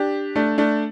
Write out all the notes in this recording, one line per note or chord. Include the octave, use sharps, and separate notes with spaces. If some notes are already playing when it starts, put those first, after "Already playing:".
Already playing: D4 G4
A3 D4
A3 D4